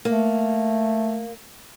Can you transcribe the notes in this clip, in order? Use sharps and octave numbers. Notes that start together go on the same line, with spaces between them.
A3 A#3